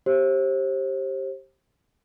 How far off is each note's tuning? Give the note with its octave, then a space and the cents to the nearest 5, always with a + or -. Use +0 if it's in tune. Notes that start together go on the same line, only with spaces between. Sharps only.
G4 -5 C5 +35